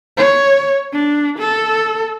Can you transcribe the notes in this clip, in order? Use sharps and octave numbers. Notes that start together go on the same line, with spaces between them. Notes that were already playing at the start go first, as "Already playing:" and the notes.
C#5
D4
A4